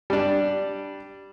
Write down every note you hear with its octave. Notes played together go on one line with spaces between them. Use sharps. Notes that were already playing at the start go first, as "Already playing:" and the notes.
G3 D4